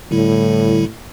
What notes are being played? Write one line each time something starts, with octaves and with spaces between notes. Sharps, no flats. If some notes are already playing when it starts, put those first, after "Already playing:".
A2 D3 G3 E4